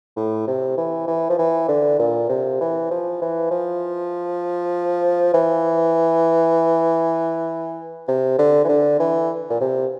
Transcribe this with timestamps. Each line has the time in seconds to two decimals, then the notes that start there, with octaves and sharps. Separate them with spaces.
0.16 A2
0.47 C3
0.77 E3
1.08 E3
1.30 F3
1.39 E3
1.68 D3
1.99 A#2
2.29 C3
2.61 E3
2.91 F3
3.22 E3
3.51 F3
5.34 E3
8.08 C3
8.39 D3
8.64 E3
8.69 D3
8.99 E3
9.50 A#2
9.60 C3